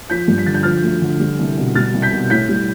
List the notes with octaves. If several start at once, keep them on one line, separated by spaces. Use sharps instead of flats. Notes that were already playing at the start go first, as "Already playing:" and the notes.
F3 G6 B6
G2
B6
D3 A6
G6
F3 F6 A6
D2
D3
G3
C2
B2
G3 F6 A6
C2
G6 B6
B2
A2 G6 B6
G3